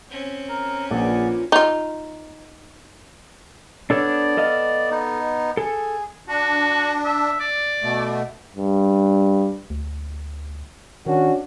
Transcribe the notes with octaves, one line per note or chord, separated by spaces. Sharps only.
C4 C#4
A#4
A#1 A#2 G#4 B4 D5 F#5
D#4 F4
B3 D4 A4 C#5 D5
A4 D#5 F5
B3 D#4
G#4 A4
D4 F#4
E5
D5
B2 A3
G2
D2
D#3 C#4 D4 F#4